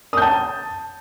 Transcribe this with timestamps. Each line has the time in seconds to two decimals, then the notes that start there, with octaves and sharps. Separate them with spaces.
0.13 D#6
0.17 G6
0.22 A5